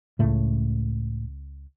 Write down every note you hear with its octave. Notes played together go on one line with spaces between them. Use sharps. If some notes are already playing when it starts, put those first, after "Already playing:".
C#2 A2 C#3 A3